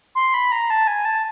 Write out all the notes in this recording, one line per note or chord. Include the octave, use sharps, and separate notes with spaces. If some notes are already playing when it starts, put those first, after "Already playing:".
C6
B5
A#5
A5
G#5
A5